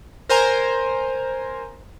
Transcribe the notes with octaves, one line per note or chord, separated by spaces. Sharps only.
A#4 C5 G#5 A#5